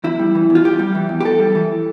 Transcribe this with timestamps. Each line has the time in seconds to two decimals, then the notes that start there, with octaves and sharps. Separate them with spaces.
0.04 E2 E4
0.19 G3
0.35 E3
0.50 E2
0.55 F4
0.64 E2 G4
0.79 G3
0.95 E3
1.09 E2
1.20 G4
1.25 E2 A4
1.40 G3
1.55 E3